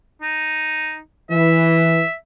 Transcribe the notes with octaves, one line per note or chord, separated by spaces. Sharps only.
D#4
E3 E5